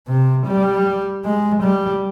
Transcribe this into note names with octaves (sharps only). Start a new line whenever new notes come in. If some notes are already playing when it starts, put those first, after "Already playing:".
C3
G3
G#3
G3